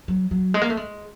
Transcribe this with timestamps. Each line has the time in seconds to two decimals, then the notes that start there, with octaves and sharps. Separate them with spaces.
0.08 F#3
0.31 F#3
0.54 G#3
0.62 A#3
0.70 A3
0.77 G#3